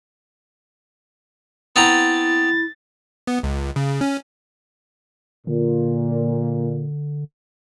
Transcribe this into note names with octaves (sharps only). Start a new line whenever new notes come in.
B3 C4 E4 A#5 A6
B3
C#2
C#3
C#4
A#2 D3